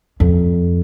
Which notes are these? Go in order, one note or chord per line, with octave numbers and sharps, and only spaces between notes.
F2